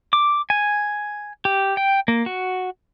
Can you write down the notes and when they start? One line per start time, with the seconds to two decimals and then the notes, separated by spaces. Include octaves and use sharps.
0.13 D6
0.50 G#5
1.45 G4
1.77 G5
2.08 A#3
2.26 F#4